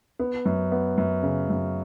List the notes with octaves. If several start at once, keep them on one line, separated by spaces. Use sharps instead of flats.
B3
F#2
B3
F#2
C#3
F#2